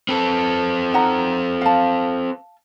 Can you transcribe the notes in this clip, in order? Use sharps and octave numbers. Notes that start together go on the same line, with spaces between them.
C4 A4 B4
D#4 F#5 A#5
F5 A5